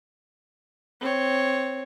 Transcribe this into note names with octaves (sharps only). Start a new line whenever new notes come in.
C4 C#5